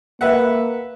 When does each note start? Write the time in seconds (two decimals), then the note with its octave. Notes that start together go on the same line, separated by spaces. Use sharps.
0.21 A#3 B4 E5 F#5